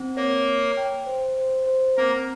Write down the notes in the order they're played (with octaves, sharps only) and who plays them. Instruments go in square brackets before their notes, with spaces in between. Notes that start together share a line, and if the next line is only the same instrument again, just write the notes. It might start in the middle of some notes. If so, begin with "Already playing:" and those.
Already playing: [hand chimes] C4
[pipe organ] A#3 A#4 [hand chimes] C#5
[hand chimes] C#5
G5
C5
C5
C5
[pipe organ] A#3 A#4 [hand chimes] C4